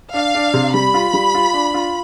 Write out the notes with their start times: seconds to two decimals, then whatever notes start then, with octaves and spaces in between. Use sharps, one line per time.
0.14 D4 F5
0.35 D4
0.54 C3
0.74 G3 B5
0.94 F4
1.13 G3
1.34 F4
1.53 D4
1.74 F4